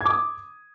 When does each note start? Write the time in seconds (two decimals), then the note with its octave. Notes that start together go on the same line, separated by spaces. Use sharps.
0.01 G#6
0.05 D6
0.10 D#6